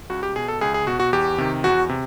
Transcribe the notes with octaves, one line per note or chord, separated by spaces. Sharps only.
C#2 F#4
G4
B2 G#4
A4
C#2 G#4
G#4
B2 F#4
F#4
E2 G4
C3 D#3
E2 F#4
C3